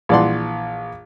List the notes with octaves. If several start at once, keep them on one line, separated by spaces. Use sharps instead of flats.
A#1 E3 D5 F#5 C6